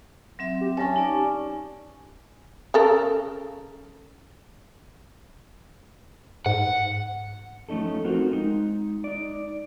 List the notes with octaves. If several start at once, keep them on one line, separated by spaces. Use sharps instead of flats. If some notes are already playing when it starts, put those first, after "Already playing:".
F#3 C4 E5
G4
F#3 C#4 C#5 A5
D#4 D5 D6
C#3 A4 A#4
G#2 F#5
F3 A3 C#4 D#4 A4
C4 D#4 F4 F#4 A#4 C5
G#3 D#4
D#4 D5